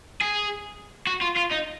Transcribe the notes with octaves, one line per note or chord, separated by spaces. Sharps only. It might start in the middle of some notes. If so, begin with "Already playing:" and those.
G#4
F#4
F4
F4
D#4